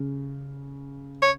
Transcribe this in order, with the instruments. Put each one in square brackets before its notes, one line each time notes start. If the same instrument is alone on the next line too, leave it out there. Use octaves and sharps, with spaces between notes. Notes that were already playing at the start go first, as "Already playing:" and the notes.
Already playing: [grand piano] C#3
[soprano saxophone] C#5